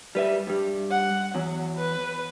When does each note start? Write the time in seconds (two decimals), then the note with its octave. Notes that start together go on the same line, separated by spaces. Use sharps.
0.15 G3 B4 E5
0.47 G2 G3
0.91 F#5
1.35 E2 F#3
1.76 B4